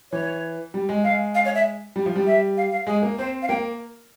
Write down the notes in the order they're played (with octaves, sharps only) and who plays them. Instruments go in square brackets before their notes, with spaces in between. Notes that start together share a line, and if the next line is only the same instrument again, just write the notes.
[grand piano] E3 [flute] C#5
[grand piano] G3
G#3
[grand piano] G#3 [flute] F5
[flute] F5
C#5
E5
[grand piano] G3
F3
G3
[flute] E5
F5
F5
[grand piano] G#3 [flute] G#4
[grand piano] A#3
[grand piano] C4 [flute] C5
[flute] F5
[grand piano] A#3 [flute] G5